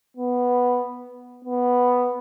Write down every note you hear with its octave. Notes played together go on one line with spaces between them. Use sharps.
B3
B3